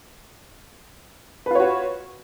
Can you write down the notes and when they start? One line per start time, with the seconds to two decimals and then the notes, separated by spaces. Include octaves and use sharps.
1.46 B4
1.51 F4
1.55 C#5
1.60 F#4